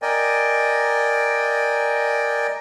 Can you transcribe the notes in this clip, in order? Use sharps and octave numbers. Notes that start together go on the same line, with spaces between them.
A#4 D5 D#5 G5 G#5